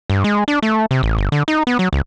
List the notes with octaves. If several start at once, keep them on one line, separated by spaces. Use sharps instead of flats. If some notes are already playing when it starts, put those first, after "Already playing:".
G2
G#3
D4
A3
C3
A1
G1
D3
D#4
B3
F#3
C#2